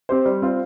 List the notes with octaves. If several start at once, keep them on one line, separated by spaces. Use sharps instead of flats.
C4 G4 C5
G3
C4 F4 C5